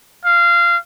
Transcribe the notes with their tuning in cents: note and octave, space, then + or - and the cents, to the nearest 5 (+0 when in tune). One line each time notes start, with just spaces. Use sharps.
F5 -20